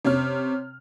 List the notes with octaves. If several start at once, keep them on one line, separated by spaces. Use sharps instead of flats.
C3 C#5 F6